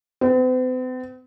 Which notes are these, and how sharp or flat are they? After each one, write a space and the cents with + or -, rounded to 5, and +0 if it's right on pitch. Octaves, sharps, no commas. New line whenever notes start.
C4 -45